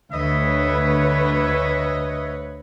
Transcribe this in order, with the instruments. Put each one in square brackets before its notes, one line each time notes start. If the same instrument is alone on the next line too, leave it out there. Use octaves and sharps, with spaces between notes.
[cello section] D2 B4 C#5 [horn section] D#5 E5